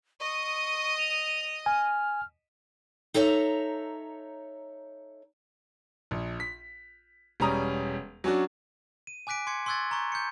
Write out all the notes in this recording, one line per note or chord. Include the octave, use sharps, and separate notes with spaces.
D#5 C#6 D#6
F7
G#5 F6
D#4 A4 C#5 E5 F5 A#5
A#1
B6
E1 G3 C#4 A#5 D#6
F#3 C#4 D4 F#4
D#7
G#5 D6 F#6 B6 D7
C6 D6 G#6 C#7 D7
C6 C#6 E6 F#6 G#6 A6
A#5 C#6 G6
G6 C#7